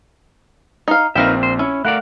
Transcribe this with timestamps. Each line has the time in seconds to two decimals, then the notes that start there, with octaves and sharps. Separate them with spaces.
0.88 D#4 F5
1.15 A#1 C4 D#4 A#4 B4 E5 F5 G5
1.43 C5
1.59 C#4 E4
1.85 A3 A#4 D5 F5 F#5 F#6